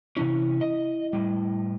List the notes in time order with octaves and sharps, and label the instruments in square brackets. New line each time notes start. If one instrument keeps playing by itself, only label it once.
[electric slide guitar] C3 E3 C#4 [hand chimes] E4
[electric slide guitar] D#5
A2 G3